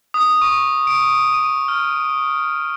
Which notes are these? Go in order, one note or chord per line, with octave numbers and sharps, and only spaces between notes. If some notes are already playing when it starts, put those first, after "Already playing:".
D#6
C#6
D7
D#7
F6